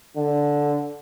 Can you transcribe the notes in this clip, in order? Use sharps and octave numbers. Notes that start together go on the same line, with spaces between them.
D3